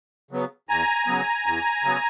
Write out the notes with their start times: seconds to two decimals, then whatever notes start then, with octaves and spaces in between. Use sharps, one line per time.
0.31 C#3 F#3 B3
0.69 E2 G#5 A#5
1.07 C#3 F#3 B3
1.46 E2
1.84 C#3 F#3 B3